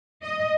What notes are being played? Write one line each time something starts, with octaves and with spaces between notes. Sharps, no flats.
D#5